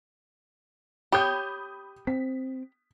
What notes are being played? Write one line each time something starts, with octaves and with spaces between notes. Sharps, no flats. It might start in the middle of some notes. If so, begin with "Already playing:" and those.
G4 C#5 B5 D#6 G6
C4 B6